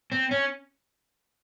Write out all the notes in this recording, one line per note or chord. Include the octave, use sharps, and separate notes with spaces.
C4
C#4